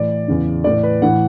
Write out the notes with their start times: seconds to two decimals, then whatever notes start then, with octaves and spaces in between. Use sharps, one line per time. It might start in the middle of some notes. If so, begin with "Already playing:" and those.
Already playing: A2 E3 D5
0.28 E2 C#3 E3
0.64 A2 E3 D5
0.83 B4
1.02 A2 E3 F#5